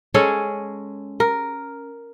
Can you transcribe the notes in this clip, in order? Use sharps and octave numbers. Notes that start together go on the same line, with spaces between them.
G#3 C#4 G#4 A4
A#4